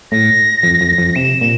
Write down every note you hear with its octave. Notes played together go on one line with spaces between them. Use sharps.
A2 A#6
F2
F2
F2
C3 E7
A#2